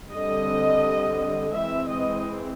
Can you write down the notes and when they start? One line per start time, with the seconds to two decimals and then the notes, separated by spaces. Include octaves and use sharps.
0.12 D3 G3 C4 D#5
1.54 E3 G#3 C4 E5
1.90 D#5